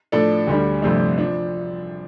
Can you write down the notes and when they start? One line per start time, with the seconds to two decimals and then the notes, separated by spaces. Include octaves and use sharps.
0.12 A2 F3 D4 A4
0.47 D2 D3 G3 D4
0.82 G1 F2 C3 A3 D4
1.18 F3 D4